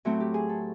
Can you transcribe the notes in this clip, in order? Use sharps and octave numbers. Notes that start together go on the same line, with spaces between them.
A2 F#3 A3 C4 F#4
G4
G#4
A4